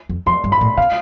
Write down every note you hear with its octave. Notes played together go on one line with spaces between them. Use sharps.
F2
F2 C6
G2
B5
A2
C3 F5